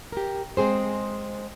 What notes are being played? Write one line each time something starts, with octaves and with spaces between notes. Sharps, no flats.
G4 A#4
G#3 C4 G#4 C5